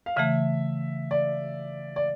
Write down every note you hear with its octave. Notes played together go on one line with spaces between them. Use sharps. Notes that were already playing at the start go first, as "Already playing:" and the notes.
F5
C#3 E3 A3 E5
D5
D5